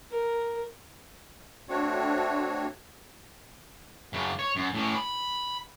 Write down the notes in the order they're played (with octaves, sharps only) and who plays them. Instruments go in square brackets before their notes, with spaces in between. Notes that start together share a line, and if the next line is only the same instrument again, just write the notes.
[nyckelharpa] A#4
[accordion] A3 C4 D4 F#4 C#5
[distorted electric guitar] F#2 C#3
C#5
F#2
A2 C#4
B5